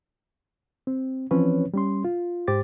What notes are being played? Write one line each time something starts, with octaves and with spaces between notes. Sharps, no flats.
C4
E3 F3 C4 C#4 B4 C#5
G3 C#4 C6
F4
G#2 G4 C5 D6 A6